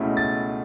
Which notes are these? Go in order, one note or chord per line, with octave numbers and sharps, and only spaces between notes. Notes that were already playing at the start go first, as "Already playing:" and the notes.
Already playing: C#2 B2 A3 C#4 E4
A6